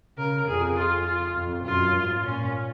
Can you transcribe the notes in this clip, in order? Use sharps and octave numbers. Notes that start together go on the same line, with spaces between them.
C#3 A#4
F2 G#4
F4
F4
F2
F#2 F4
G#2
A#2 C#4